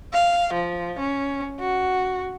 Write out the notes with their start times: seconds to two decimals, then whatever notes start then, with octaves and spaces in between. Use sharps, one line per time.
0.13 F5
0.53 F3
0.99 C#4
1.60 F#4